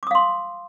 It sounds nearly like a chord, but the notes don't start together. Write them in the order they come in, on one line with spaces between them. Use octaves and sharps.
D6 D#6 F5 C6